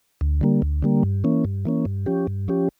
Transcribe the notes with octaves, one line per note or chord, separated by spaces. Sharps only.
D2
D3 G3 A#3
D2
D3 G3 A#3
G2
E3 A#3 C#4
G2
E3 A#3 C#4
G2
F3 C#4 G4
G2
F3 C#4 G4